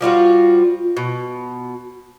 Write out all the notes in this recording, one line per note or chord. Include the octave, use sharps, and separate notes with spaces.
F3 G3 F4 F#4
B2